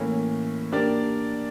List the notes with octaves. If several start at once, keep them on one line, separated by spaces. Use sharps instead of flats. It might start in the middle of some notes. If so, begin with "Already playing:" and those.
Already playing: A2 E3 A#3 C#4
A#3 D4 G4 A#4 D5